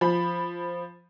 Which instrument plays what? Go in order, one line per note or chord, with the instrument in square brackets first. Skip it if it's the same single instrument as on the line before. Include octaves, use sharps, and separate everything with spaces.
[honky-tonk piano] F3 B5